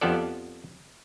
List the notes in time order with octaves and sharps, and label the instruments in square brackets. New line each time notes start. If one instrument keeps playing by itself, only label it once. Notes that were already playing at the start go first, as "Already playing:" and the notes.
[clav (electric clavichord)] F2 F3 B3 G4 A4 D5